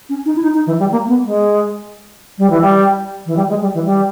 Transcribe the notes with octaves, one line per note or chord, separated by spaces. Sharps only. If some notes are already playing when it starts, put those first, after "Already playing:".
C#4
D#4
E4
D#4
D#4
E3
G3
A#3
B3
G#3
G3
E3
G3
E3
G3
G#3
G3
E3
G3